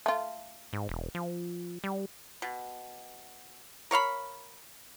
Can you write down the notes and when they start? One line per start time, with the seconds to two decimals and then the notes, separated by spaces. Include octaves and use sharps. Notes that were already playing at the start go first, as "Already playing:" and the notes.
0.06 A3 F4
0.73 G#2
0.89 E1
1.15 F3
1.84 G3
2.42 B2
3.91 A#4 C#5 F5 B5